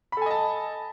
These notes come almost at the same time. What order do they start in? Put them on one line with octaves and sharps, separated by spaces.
B5 A4 G#5 D#5 A5